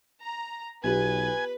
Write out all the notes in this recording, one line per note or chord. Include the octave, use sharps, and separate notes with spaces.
A#5
B1 B3 F4 G4 B4 G#5